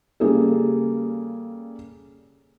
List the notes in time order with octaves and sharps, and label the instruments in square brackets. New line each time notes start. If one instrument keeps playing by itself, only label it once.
[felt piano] C#3 G3 A#3 G#4 A4